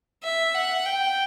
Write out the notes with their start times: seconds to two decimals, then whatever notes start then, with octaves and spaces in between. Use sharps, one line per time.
0.23 E5
0.54 F#5
0.85 G5